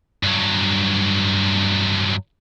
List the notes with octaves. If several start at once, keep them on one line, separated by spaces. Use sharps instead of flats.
G2 F#3